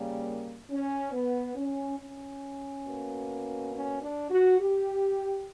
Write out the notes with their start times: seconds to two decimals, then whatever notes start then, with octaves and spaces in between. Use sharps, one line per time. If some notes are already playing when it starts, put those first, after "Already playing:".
Already playing: C#3 G3 A#3
0.70 C#4
1.13 B3
1.56 C#4
1.99 C#4
2.86 B2 A#3
3.73 C#4
4.01 D4
4.30 F#4
4.60 G4